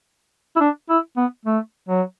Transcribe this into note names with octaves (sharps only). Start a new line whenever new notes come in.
E4
D4
E4
B3
A3
F#3